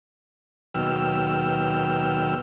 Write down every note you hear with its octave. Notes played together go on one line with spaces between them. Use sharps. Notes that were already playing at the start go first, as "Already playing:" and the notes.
D#2 B2 F#3 G5 E6 F6